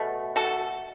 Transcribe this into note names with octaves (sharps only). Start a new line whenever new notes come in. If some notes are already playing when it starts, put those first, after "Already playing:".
Already playing: B2 A3
F#4 A4